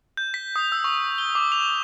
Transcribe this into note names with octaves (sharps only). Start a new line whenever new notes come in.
G6
B6
D#6
E6
C#6
G7
D6
F7